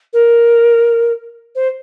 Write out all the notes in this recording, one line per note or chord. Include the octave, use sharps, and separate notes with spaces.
A#4
C5